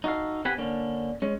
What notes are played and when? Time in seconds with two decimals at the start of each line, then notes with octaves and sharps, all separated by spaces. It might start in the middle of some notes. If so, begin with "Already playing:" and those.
0.04 D#4 F#4 G#4 A4 F5
0.45 C4 G4 B4 F#5 G#5 B5
0.58 D3 A#3 C#4 D4
1.22 G#3 C#4